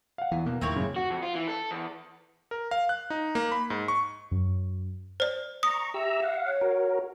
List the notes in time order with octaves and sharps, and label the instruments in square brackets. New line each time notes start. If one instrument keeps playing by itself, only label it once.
[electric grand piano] F5 F#5
[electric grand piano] E2 [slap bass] E3
[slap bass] B2 [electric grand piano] A#3
[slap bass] D#2 A2 D#3 [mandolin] C4 E4 C#5
[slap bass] F#2 A#2 [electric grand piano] C#3
[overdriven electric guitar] F#4
F2
F4
E3
A4
E2
[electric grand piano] A#4
F5
F#6
D#4
A#3
B5
G#2
C#6
[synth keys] F#2
[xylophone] C5 D5
[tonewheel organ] A#5 C#6 [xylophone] D#6
[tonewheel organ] G4 A#5 E6 [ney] E5
[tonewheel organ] F5 F#5
[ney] C#5
[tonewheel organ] F#4 A#4